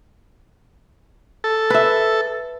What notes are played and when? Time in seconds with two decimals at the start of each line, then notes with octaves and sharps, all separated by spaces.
1.44 A4
1.70 B4 E5